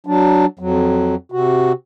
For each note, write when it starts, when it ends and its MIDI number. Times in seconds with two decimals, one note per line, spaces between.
0.06 0.46 54
0.06 0.46 62
0.59 1.15 41
0.59 1.15 54
1.32 1.72 48
1.32 1.72 66